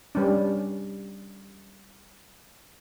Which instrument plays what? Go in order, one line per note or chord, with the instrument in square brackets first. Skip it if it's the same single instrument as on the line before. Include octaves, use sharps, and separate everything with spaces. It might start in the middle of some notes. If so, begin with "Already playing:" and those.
[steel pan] G3 C#4 D4